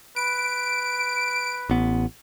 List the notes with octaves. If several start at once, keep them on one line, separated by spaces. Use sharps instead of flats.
B4 D7
A1 B3